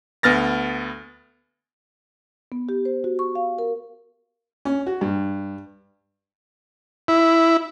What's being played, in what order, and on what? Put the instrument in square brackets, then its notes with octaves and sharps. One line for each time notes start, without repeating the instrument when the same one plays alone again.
[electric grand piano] D2 B3 F6 A6 A#6
[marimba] B3
G4
C5
F#4
C#6
F5
A#4
[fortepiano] C#4
F#4
G2
[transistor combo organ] E4